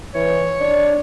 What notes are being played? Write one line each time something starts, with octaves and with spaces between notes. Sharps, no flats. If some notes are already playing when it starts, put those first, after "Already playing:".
E3 C#5
D4